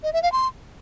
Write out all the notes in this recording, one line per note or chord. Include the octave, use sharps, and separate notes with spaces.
D#5
E5
F5
C6